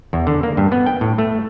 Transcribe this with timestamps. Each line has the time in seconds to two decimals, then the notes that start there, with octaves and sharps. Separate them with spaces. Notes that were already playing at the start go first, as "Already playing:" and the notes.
0.13 E2
0.27 D3
0.43 A#3
0.57 G2
0.72 B3
0.86 G5
1.01 A2
1.18 A3